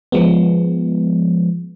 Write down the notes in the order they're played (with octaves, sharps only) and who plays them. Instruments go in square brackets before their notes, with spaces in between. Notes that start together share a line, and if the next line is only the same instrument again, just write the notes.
[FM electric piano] F3 G#3 B3